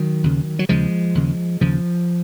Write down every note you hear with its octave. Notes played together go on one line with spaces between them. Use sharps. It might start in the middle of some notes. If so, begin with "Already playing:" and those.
Already playing: D#3 F#3
D#2 C#3
F#3
D#2 C#3 F3 G#3
D#2 C#3
D#2 C#3 F3